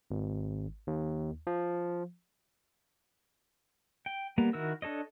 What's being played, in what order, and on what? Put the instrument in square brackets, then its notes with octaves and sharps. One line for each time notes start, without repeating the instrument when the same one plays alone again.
[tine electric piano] G#1
D#2
F3
[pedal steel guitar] G5
G3 A#3 B3 A#5
D#3 E4 F#4 A#4 E6
D4 A4 C#5 D#5